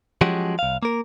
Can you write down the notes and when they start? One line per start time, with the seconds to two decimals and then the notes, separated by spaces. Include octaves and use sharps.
0.21 F3 F#3 G#3 C#4 F#4 G4
0.59 C2 F5
0.83 A#3 A#4